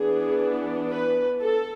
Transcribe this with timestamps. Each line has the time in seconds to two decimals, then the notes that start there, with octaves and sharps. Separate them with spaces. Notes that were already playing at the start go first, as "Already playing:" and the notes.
Already playing: E3 B3 D4 G#4
0.90 B4
1.42 A4